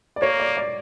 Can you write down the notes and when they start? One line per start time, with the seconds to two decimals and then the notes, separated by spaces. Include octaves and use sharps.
0.16 D5
0.22 A#3 C#5
0.40 D5
0.57 D5